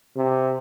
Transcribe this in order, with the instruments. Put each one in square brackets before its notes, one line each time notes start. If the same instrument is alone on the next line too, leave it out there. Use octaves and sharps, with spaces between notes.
[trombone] C3